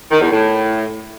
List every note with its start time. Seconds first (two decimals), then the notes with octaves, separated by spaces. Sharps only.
0.11 D#3
0.21 E2
0.30 A2